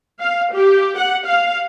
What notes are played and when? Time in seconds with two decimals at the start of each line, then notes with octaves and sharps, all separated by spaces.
0.20 F5
0.53 G4
0.98 F#5
1.27 F5